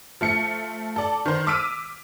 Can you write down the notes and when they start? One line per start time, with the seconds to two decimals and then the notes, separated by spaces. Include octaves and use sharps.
0.21 F3 A3 C#7
0.96 A4 D5
1.26 D#3 C5
1.47 D6 E6 F6 B6 D7 D#7